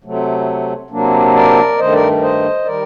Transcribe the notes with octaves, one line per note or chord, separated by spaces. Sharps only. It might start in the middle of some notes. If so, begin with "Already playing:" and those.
C3 F#3 A3
C3 F#3 A#3 D4
A#4 D5
G2 D#3 A3 C5 D#5
A#4 D5
C5 D#5
D#3 G3 A#4 D5